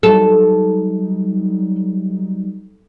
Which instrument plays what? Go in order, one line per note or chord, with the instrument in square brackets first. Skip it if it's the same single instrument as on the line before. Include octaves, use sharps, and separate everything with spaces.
[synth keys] F#3 G3 D#4 [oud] A4